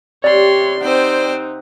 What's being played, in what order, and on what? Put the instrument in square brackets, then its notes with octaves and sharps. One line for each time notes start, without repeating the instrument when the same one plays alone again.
[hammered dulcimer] C3 [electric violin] C#5 C6 [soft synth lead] D5
[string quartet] C4 G4 C5 [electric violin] D#4 [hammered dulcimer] F#5